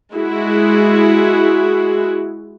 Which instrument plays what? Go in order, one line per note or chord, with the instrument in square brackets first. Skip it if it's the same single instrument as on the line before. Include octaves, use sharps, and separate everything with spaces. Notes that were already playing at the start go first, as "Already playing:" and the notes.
[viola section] G#3 E4 F#4 G#4